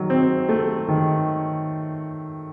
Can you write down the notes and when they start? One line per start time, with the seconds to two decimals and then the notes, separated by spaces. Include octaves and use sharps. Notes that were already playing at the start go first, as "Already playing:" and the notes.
Already playing: D#3 F#3
0.10 C4
0.49 A3
0.88 D#3